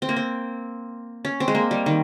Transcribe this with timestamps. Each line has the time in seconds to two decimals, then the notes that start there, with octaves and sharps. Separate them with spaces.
0.02 C4
0.09 A#3
0.16 C4
1.25 C#4
1.40 C4
1.48 G#3
1.55 A#3
1.71 G3
1.86 D#3